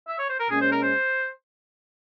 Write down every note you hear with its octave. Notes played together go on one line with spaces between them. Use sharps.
E5
C#5
C5
A#4
A#2 G#3 C#4 G#4
C5
A#4
C5